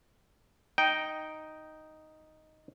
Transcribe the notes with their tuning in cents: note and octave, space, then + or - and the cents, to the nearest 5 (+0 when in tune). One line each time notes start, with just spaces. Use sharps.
D#4 +0 G5 -10